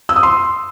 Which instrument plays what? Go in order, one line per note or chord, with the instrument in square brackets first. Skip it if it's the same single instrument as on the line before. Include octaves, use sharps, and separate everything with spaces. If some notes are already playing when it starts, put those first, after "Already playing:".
[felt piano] E6
D#6
C6